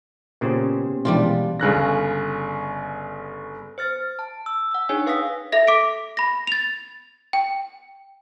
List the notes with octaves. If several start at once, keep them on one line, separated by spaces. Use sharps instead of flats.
A#2 C#3 B3 C#4 G4 C5
A#1 B2 E3 G3 G#3 D4 F4
G1 C#3 F#6 A#6
C5 F6 A6
A5
E6
F#5 E6
D4 D#4 G#4 C#5 G#5
B4 F5 D#6 E6 B6
A4 E5 A#6
D6 B6 D7
B5 A#6
A6 F7
G5